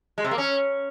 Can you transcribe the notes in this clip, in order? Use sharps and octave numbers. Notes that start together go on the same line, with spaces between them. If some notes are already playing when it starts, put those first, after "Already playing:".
G#3
C3
A#3
C#4